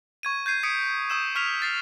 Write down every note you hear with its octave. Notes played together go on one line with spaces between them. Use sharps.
C#6 G#6 D#7
G6 G#6 C7 D#7
D#6 G#6 B6 C#7 D7
C#6 D#6 E6 E7
C#6 F6 B6 F7
A6 C7